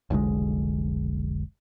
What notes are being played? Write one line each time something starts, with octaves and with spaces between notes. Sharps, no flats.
F1 B1 D3 G#3